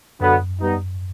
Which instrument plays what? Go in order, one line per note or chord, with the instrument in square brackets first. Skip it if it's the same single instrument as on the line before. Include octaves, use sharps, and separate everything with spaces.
[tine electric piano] F#2 [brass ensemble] D3 F#3 B3
[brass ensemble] G3 B3 D#4